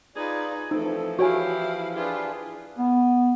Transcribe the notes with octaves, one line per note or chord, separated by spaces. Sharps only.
D#4 F4 G#4 B4 D5
E3 F3 A3 C4 D#4 A4
E4 F#4 G4 C#5 F5 G#5
D4 E4 F4 G4 G#4 B4
B3